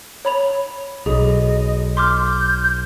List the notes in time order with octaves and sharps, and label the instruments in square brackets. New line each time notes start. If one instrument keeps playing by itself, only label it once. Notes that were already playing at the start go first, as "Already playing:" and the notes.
[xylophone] C#5 B5 F7
[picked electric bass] B1 [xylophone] G#4 [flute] D#5
[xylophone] C6 D6 F6 [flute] G6